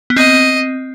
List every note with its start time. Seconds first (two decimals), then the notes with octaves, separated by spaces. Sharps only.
0.10 B3
0.16 C4 D#5